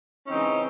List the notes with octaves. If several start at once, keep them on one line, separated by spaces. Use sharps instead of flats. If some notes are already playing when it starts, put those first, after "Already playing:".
C#3 E3 G#3 C4 C#4 D#4